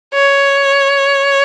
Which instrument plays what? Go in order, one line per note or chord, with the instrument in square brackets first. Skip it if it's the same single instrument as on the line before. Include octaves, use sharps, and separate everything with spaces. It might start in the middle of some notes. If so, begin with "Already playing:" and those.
[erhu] C#5